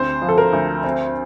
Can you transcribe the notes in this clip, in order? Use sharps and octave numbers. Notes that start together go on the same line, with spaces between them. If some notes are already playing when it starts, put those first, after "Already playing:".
Already playing: D2 C4 C5
F3
A4
A#4
D2
C4